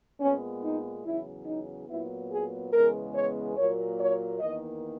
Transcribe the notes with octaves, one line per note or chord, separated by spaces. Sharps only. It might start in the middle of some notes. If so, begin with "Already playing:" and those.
A#2 G#3 B3 C#4
D#4
E2 C#3 F#3 E4
D#4
A#2 F#3 B3 E4
G#4
E2 C#3 G#3 B3 A#4
C#5
A#2 F#3 A#3 C#5
C#5
E2 D#3 A#3 D#5